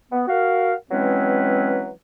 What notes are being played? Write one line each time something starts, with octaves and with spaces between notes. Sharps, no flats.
B3
F#4 A#4 F5
E3 F#3 G#3 C4 C#4 B4